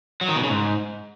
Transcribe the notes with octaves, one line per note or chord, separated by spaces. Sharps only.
F#3
D#3
B2
C#3
G#2